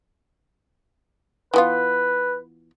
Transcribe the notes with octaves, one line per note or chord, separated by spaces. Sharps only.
E3 B3 F4 B4